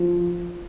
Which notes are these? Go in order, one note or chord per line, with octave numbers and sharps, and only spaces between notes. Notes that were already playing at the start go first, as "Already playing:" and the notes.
Already playing: F3